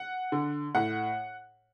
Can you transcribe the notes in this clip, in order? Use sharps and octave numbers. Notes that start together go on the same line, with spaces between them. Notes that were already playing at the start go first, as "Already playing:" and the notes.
Already playing: F#5
D3
A2 F#5